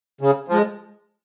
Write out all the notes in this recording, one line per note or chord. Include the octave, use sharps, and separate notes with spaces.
C#3
F3 G#3